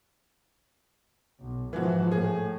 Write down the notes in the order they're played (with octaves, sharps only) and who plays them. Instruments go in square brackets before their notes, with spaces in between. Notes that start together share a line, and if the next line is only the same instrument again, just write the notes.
[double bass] B1
[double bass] G#2 F3 [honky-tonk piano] E3 F#4
[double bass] A2 A3 [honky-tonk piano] G#4